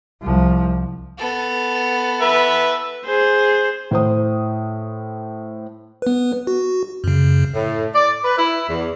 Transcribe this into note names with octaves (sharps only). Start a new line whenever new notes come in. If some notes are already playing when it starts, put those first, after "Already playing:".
C2 F3
B3 A4
B4 E5
G#4 C5
A2 C5 D#6
B3 B4
F#4
F#2 C#3
A2
D5
B4
E4
E2